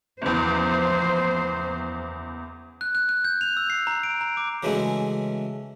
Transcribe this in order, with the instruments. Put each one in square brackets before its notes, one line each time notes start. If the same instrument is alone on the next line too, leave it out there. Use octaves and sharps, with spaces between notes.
[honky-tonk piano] F#1 E2 [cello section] F3 C5
[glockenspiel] F#6
F#6
F#6
G6
F7
E6
C7
A#5
D7
A#5
D6
[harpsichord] C#3 E3 F#3 G#3 A3 C#4